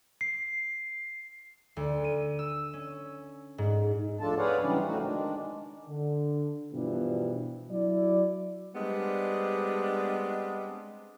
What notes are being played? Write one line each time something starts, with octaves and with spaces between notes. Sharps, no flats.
C7
D2
D#7
E6
C#4
G#2
D2 F3 D4 F4 A4 A5
G#4 B4 C#5 D5 F5 F#5
C#3 E3 F#3 G3 C#4 D4
A2 F3 A3 C4 D#4 F#4
D#3 G#3 D4
D3
G2 B2 E3 F3 G3 D4
F#3 E4 D5
G3 G#3 B3 C4 D4